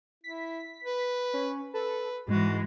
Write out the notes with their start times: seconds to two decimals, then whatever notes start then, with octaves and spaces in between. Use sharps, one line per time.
0.24 E4 B6
0.84 B4
1.34 C#4
1.74 A4 B4
2.28 G#2 E3 G#3 F#4